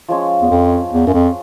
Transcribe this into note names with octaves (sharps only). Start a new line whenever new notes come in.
F3 G#3 C#4
E2
F2
E2
F#2
F2